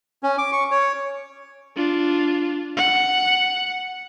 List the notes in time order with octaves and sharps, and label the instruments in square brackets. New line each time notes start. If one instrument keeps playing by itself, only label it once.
[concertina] C#4
D6
C#6
C#5
[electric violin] D4 F4
F#5